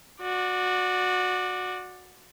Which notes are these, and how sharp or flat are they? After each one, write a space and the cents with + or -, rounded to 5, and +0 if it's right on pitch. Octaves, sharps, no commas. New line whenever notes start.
F#4 -15 D5 +10